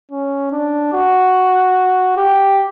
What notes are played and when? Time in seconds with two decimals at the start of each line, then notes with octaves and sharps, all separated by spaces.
0.12 C#4
0.52 D4
0.93 F#4
2.17 G4